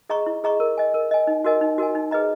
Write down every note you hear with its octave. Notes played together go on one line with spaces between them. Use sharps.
G#4 D#5 A#5 C#6
E4
G#4 D#5 A#5 C#6
A#4
D#5 G#5
A#4
D#5 G#5
D#4
F#4 A#4 D#5 G#5
D#4
F#4 A#4 D#5 G#5
D#4
G#4 B4 D#5 A#5